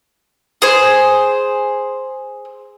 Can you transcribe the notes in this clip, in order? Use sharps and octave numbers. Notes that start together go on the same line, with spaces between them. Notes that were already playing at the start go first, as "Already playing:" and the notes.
G#4 C5